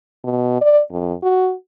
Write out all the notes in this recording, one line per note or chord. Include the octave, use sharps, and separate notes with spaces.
B2
D5
F2
F#4